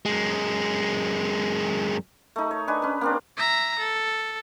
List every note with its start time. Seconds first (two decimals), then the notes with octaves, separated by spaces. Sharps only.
0.06 F#2 G#3
2.36 A3 D#4
2.51 C#5
2.68 D4 B4 D#5 G#5
2.82 C#4 B4
3.01 A#3 C4 D4
3.37 E5 A#5
3.79 A4